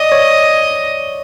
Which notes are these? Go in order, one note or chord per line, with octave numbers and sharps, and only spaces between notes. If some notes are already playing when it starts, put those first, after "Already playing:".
Already playing: D5 D#5
C#5